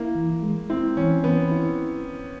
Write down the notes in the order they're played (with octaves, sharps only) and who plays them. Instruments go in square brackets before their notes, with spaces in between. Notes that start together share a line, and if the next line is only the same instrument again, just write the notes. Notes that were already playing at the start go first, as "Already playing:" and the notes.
Already playing: [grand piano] A#3 [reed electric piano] E4
[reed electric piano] E3
G#3
[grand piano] C4 [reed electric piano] E4
[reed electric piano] E3 [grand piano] C#4
[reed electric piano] E3 [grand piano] B3
[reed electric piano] E4